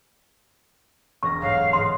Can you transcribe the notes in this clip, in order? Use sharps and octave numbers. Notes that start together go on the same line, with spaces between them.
E1 A#4 C#6 A#6
B1 G#2 F5
G#2 E3 D#5 C6